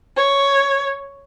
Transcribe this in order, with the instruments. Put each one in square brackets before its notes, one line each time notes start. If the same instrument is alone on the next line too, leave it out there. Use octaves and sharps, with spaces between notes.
[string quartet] C#5